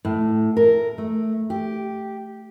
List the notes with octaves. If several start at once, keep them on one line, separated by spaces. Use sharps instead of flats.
A2
A#4
A3
G4